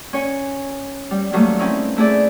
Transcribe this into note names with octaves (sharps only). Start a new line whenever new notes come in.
C#4 C#5 G#5
G3
D#3 F#3 G3 A3 A#3 C#4
C4 C#4 D#4 E4
A3 E4 G#4 D5